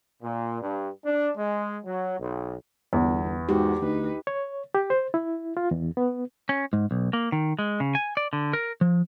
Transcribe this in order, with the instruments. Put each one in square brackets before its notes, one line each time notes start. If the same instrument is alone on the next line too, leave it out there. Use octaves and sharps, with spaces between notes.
[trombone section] A#2
G2
D4
G#3
F#3
B1
[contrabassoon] G1 [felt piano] E2
[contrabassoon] G#2 [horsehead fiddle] F#4 [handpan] G4
[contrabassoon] D2 [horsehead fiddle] D#4 B4
[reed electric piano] C#5
G4
C5
E4
F4
E2
B3
[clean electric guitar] C#4
G#2
B1
A#3
D#3
G#3
C#3
G#5
D5
D3
A#4
F3